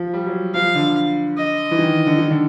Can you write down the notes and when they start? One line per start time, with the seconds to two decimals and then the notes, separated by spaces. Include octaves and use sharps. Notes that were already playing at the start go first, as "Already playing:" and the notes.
Already playing: F3
0.14 G3
0.27 F#3
0.54 F3 F5
0.75 D3
1.37 D#5
1.71 E3
1.79 D#3
2.07 D3
2.18 D#3
2.31 D3